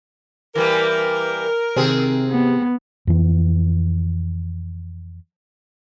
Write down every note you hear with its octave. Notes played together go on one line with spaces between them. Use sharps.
E3 G3 A#3 A#4
C3 D#3 C4 G#4
B3
F2 E3